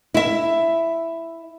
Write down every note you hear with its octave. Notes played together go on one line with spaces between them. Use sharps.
E4 E5